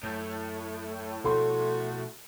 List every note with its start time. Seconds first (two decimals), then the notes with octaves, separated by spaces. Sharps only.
0.03 F#2 A2
1.24 B2 F3 B3 F#4 A4 C6